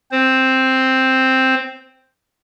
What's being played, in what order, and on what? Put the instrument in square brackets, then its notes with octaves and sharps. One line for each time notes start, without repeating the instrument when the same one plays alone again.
[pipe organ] C4 C5